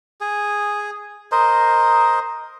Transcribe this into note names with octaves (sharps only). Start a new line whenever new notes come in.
G#4
A#4 C5 D#5